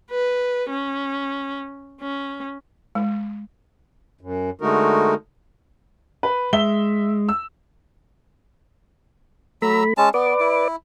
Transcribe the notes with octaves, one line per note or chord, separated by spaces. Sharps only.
B4
C#4
C#4
G#3
F#2
D3 G#3 A3 D#4 F#4 A#4
B4
G#3 E5 G7
E6
F#3 A3 A#5 B5 E6
G#3 C#4 A5
B3 B4 D5 D6
E4